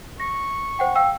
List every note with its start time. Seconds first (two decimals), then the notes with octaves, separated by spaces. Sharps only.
0.20 C#6 A#6
0.79 C5 F#5 G5
0.96 F5 G5 E6